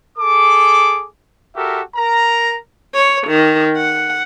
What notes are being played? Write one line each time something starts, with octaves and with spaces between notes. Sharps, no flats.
G#4 A4 D6
F#4 G4 A4 A#4 E5
A#4 A#5
C#5
D#3
F#5